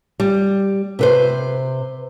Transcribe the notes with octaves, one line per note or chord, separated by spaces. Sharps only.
G3
C3 B4 C5